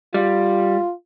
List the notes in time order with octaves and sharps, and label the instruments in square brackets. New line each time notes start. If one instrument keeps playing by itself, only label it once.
[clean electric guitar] G3 [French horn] F4